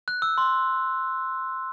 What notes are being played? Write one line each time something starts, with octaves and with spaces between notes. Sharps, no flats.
F#6
E6
C6